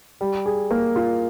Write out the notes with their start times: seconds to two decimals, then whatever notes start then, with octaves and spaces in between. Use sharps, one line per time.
0.21 G3
0.46 G#4
0.71 A#3
0.96 F4